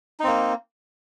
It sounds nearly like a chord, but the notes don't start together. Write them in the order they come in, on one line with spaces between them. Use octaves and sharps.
D#4 C4 A#3